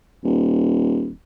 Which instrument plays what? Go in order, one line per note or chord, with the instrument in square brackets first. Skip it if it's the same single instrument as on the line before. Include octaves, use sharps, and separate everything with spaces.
[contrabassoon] D#1